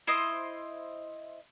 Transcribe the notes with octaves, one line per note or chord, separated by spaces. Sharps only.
E4 C5 D#5